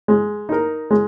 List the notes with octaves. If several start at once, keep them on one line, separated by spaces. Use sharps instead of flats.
G#3
D#4 A#4
G#3